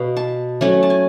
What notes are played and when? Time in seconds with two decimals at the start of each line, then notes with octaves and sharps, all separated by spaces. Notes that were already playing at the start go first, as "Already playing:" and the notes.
Already playing: B2 F5
0.17 A5
0.61 F#3 A3 C#4 G#5
0.83 A5
0.90 G#5